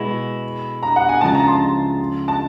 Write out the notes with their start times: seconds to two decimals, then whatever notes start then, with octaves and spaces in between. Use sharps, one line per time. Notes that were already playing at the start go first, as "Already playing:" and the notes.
Already playing: B2 G#3 B3 E4
0.83 A#5
0.96 F#5
1.09 G#5
1.21 C#2 C#3 F3 A5
1.34 A#5
1.48 C6
2.28 A5